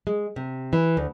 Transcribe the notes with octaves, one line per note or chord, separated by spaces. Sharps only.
G#3
C3
E3
D2